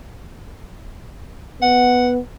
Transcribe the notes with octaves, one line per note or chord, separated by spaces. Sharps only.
B3 F#5